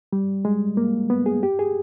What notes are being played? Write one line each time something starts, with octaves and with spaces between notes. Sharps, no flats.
G3
G#3
A#3
B3
G#4
G4
G#4